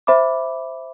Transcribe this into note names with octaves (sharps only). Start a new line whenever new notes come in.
C5 E5 B5 D6